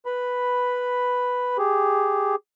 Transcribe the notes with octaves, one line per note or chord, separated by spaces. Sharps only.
B4 B5
G4 G#4